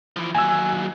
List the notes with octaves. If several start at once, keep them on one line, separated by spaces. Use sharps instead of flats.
E3 F3
D#2 F#3 G#5 E6